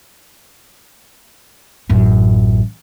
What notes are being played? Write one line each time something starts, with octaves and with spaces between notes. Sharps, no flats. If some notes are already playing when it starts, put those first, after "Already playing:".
A1 F#2